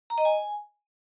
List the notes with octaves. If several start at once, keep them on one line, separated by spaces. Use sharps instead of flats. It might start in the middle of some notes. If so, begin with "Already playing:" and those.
A#5
D#5
G#5